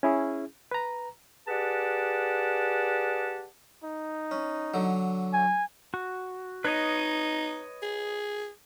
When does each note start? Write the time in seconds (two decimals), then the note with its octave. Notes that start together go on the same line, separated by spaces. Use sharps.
0.03 C#4 E4 G#4
0.71 B4 A#5
1.48 G4 G#4 B4 D5 F#5 A5
3.83 D#4
4.31 C#4
4.74 D3 F#3
5.33 G#5
5.94 F#4
6.65 D#4 B4 C#5 D#5
7.82 G#4